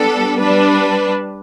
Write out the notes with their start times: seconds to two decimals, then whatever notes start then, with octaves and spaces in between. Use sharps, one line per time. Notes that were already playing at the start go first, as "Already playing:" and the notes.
Already playing: G3 B3 D4 A4
0.38 G3 D4 B4